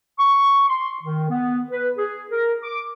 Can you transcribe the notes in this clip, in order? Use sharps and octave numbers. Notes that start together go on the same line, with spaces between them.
C#6
C6
D#3
B3
B4
G#4
A#4
D6